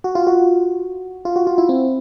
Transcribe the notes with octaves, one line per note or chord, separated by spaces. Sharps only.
F#4
F4
F#4
F4
F#4
F4
E4
C4